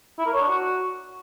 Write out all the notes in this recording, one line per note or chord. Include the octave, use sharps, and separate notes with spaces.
E4
A#4
C#5
D4
F#4